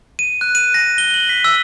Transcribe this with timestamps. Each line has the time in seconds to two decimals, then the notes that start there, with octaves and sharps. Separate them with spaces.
0.19 D#7
0.41 F#6
0.55 D#7
0.74 A#6
0.98 G7
1.14 F#7
1.29 B6
1.44 E6